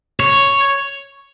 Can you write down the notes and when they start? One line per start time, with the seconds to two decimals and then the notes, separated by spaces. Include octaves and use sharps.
0.20 C#5